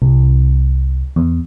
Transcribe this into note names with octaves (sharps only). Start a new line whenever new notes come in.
C2
E2